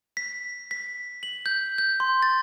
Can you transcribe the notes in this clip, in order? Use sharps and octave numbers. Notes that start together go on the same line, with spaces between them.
B6
B6
F#7
G6
G6
C6
A6